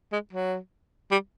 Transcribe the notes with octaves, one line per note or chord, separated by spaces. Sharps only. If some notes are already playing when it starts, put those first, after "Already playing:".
G#3
F#3
G3